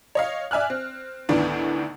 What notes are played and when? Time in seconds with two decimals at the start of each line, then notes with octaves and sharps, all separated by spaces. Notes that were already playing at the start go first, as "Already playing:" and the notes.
0.15 C#5 D#5 F5
0.51 D5 E5 G#5 F6 F#6
0.70 C4
1.29 D2 A2 D#3 B3 D4